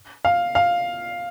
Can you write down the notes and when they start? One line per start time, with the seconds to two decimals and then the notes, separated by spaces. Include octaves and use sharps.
0.25 F5
0.55 F5